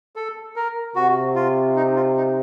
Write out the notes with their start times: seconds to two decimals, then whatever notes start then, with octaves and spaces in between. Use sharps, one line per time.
0.16 A4
0.56 A#4
0.96 C3 F#4
1.36 F4
1.76 D#4
1.96 F4
2.17 D#4